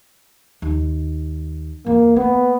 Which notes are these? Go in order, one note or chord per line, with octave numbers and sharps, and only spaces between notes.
D#2
E2 A#3
A#3 B3